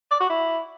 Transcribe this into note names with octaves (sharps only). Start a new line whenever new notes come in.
D5
F#4
E4